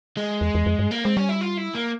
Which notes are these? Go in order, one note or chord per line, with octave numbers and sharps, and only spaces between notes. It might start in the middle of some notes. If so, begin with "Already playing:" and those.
G#3
E2
E2
F2
G2
A#3
G#3 C4
G3 C#4
E4
F4
E4
A#3